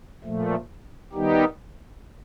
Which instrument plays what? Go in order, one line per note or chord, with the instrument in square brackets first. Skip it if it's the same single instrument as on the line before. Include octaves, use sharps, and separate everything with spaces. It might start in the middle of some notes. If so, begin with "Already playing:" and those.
[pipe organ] A#2 F3 A3
D#3 G3 B3 D#4 G4